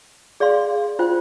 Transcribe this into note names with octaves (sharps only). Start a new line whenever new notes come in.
G#4 D5 F5 C6
F4 C5 G5